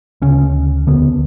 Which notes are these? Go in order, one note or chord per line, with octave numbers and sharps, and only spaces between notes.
D2 C#3 C#4
D#2 D3 B3